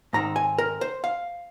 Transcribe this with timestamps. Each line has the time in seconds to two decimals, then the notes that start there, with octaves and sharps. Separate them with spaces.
0.13 G#2 D#3 C4 A#5
0.36 G#5
0.58 A#4
0.81 C5
1.04 F5